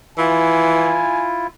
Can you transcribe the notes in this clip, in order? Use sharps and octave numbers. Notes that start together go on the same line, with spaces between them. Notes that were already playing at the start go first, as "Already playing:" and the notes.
E3 E4 F4 G#5